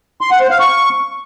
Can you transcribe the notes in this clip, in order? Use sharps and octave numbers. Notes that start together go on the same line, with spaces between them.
C6
F#5
C5
F5
C#6